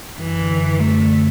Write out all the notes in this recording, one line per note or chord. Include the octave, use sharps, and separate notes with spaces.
F#2 E3
D3
F#2
F#2 A3
D3